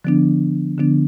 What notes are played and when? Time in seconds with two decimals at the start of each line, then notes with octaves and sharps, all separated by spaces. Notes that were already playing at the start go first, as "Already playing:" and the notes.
0.04 D3 F3 B3 D4
0.78 D3 F3 B3 D4